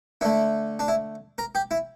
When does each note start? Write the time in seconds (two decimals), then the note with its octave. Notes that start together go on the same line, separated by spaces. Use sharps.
0.21 D3 A3 E4
0.79 D4
0.88 E4
1.38 A#4
1.55 G4
1.71 E4